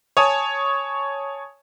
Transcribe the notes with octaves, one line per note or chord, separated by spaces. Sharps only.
C#5 G#5 A5 D#6